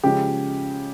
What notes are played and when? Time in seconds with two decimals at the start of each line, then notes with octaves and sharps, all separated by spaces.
0.03 C#3 F3 G#3 G4